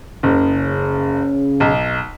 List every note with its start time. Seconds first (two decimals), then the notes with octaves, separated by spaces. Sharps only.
0.23 F#1 C#3
1.60 B1